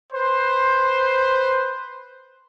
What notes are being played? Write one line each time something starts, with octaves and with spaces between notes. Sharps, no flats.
B4 C5